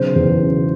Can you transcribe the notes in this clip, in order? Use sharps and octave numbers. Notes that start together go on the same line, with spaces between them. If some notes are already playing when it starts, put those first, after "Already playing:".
Already playing: B1 C#3 C5
E2
C#3